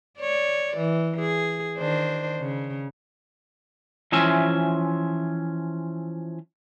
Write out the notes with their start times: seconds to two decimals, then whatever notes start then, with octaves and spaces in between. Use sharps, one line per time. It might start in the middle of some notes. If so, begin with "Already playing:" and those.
0.19 C#5 D5
0.77 E3
1.20 G#4
1.79 D#3 D4 C5
2.40 C#3
4.12 E3 F3 C#4 E5